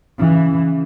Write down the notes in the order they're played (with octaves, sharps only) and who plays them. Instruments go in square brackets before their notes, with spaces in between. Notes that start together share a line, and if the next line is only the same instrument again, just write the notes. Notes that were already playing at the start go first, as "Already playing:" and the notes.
[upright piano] C#3 [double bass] E3